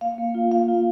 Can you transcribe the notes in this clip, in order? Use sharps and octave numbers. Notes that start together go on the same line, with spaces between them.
A#3 F5
A#3
F4
A#3 F5
F4